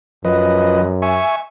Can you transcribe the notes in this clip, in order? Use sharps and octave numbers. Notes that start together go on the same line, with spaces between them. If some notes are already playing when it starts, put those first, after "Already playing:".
F#2 F3 B4 D#5
E5 G#5 C#6